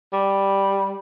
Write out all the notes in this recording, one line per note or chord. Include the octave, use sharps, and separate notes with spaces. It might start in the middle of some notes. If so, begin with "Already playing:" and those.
G3